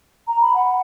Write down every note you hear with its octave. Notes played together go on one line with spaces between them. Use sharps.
A#5
B5
F#5